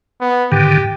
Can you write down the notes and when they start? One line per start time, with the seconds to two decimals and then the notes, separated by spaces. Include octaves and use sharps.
0.21 B3
0.52 G#2 D3 D#3 G4